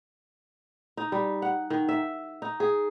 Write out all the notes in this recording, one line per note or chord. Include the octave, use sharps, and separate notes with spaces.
D#4
G3
F#5
D#3
E5
D#4
G#4